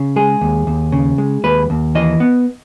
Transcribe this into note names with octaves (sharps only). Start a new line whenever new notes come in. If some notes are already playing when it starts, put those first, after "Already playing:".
Already playing: C#3
G#3 G#4
D#2
D#2
C#3
G#3
D#2 B4
D#2
E3 D#5
B3